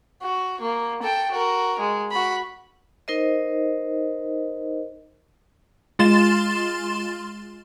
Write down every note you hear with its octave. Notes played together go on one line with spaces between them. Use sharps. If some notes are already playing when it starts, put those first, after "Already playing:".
F#4
A#3
A4 G5
F#4 A#4
G#3
F#4 B5
D#4 A#4 C5 D#5
G#3 F4 C6 A6 E7